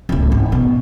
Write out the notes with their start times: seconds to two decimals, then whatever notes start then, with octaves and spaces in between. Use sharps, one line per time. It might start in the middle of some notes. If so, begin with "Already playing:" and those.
0.09 C#2 A2
0.32 G#1
0.52 B2